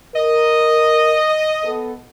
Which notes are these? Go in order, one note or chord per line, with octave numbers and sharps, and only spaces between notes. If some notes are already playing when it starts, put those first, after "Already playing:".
A#4 D#5
B3 A4